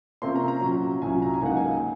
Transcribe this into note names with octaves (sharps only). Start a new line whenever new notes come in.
C3 F3 A#3 C#4 C6
A#5
A#5
A#2 F#3 C#4
C2 A#2 F#3 C#4 G#5
A#5
G#5
C#2 C#3 F#3 A#3 D#4 F#5
G#5